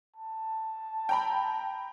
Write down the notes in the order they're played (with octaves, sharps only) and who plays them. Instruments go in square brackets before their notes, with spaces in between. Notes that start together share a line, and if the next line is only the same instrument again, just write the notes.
[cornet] A5
[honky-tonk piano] G5 A#5 B5